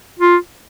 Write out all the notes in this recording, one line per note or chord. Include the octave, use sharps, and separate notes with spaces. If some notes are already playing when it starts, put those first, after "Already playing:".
F4